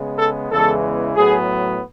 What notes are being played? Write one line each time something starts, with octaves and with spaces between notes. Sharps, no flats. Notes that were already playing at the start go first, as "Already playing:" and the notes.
Already playing: C#3 G#3 B3
A4
E2 C#3 E3 G#3 B3 A4
A2 F#3 B3 G#4